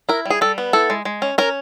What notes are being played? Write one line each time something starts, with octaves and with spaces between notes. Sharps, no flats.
E4 A#4
G3 G#4
G3 A4
B3
E4 A4
G#3
G#3
C#4
C#4 A#4